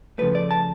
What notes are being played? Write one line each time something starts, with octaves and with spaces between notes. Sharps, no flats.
C#3 F3 A3 B4
D5
A5